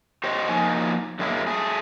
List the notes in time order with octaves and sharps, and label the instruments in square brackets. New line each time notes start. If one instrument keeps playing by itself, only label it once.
[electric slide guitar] G4 C5 C#5 D#5
F3 A#3 D#4 G#5
F#2 D3 G#3 A#3 E4
A3 G#4